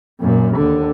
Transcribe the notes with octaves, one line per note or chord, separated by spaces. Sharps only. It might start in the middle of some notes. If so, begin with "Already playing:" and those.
F#2 A#2
D#2 D3